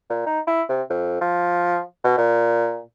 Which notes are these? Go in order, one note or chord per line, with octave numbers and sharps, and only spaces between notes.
A#2
D#4
E4
C3
F2
F3
B2
A#2